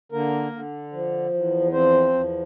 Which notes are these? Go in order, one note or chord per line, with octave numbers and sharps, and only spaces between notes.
D3 A#3 A#4
D3
F3
E2
F3 C4 C5
E2